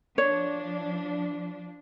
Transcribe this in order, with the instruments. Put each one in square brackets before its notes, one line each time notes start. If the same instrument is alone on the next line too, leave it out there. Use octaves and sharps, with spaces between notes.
[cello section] F3 D4 [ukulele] C#5